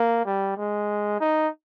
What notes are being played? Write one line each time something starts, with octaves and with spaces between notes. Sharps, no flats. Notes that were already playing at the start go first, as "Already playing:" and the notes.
Already playing: A#3
G3
G#3
D#4